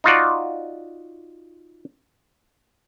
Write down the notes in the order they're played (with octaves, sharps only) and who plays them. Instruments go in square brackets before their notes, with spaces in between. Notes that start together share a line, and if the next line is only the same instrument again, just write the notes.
[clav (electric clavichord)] D#4 F4 F#4 D5